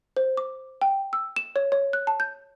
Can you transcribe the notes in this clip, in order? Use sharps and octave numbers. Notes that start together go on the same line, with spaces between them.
C5
D6
G5
E6
E7
C#5
C#5
F#6
A5
G6